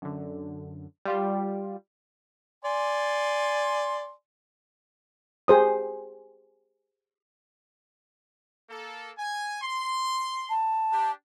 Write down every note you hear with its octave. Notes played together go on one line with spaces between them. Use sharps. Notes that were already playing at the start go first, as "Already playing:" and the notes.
F#2 D3
G3 F4 G4
D5 G#5 C6
G4 G#4 C5 D#6
A#3 A4
G#5
C6
A5
D4 G4